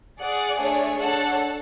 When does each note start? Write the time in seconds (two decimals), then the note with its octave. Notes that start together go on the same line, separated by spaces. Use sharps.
0.19 G#4 D5 F#5
0.59 A3 D4 G#4 C#5
0.99 D4 A4 C#5 F#5 A5